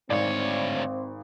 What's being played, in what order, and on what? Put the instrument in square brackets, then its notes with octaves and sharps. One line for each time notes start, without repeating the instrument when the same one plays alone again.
[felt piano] G#1 [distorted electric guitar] D2 C#5 [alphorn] C4 [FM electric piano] D5